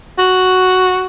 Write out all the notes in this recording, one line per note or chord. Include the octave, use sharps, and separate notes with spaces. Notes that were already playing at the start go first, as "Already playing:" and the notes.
F#4